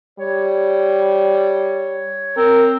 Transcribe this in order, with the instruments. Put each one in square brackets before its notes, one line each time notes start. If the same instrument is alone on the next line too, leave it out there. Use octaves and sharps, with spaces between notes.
[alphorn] G3 [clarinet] C#5
[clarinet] C4 [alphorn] A#4